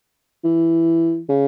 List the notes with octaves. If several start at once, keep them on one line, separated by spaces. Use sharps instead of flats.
E3
C#3